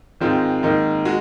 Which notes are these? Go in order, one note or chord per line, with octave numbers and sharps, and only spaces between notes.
G#2 D#3 G#3 C4 F4
G#2 D#3 A#3 D#4
G#3 F#4